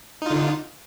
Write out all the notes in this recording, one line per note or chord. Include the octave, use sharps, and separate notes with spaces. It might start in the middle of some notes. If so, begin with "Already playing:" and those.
D3 D#4 F4